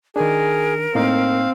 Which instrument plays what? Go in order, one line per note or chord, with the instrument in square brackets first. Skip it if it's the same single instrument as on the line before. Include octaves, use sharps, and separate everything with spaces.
[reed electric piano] D#3 D4 [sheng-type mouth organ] G#4 [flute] A#4
[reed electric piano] A2 A#3 D#4 [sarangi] C4 [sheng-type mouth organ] F5